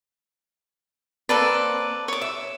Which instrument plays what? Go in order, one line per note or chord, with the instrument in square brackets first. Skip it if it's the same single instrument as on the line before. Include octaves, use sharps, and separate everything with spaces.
[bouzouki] A#3 C4 D4 [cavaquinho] A4 B4 D5
[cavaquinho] C#5 D6
[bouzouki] E5